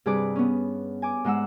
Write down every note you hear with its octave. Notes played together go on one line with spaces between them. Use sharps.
G2 C3 G#4 B4 D5 D6
B3 C#4
G#5 D6
G#2 G#3 F#5 E6